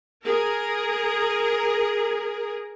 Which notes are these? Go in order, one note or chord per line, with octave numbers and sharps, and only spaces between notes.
G#4 A#4